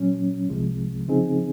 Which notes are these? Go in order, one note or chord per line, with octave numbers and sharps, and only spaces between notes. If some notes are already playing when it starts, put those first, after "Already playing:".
Already playing: A#2 F#3 C#4
C2 C3 F3 G#3
C#3 F3 C4 D#4 G#4